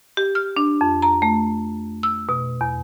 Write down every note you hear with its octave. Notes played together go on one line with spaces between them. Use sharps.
G4
F6
D4
F2
A#5
A3
E6
B2
E2